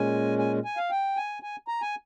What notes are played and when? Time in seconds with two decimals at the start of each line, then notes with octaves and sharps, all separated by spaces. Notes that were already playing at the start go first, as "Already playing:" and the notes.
Already playing: A#2 G#3 C#4 G#5
0.38 G#5
0.65 G#5
0.77 F5
0.90 G5
1.17 G#5
1.43 G#5
1.68 A#5
1.82 G#5